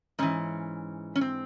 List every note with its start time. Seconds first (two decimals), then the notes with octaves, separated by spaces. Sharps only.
0.19 G#2 E3 C#4
1.16 C#4
1.21 C4